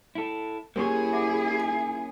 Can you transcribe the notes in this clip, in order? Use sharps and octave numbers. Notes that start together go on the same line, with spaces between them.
E4 A4
A#3 C#4 E4 G4 G#4 A#4 C6 C#6
E5 F#5 D6
G#5